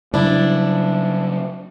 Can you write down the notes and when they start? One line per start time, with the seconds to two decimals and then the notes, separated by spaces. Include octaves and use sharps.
0.14 C#3 F#3 G3 D4 E4